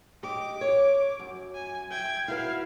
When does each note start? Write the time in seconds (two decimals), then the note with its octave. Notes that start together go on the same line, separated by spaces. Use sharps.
0.23 G4 D#5 D6
0.61 C#5
1.19 F#2
1.54 G#5
1.91 E5 G5 G#6
2.28 E4 F#4 B4 F5